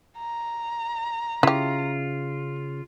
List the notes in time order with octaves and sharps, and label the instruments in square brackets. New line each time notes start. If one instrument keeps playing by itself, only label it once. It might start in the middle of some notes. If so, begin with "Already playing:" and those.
[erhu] A#5
[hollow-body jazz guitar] C#3 [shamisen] E4 G4 [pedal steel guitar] F4